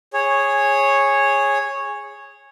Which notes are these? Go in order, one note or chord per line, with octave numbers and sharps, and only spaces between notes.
G#4 C#5